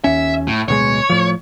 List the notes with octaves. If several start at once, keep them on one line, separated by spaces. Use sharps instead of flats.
D#2 C#4 E5
A2
D1 B2 G#3 C#5
A2 F3